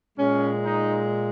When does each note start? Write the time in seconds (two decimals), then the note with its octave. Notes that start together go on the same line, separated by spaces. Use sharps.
0.17 A#2 G#3 C#4
0.63 D#4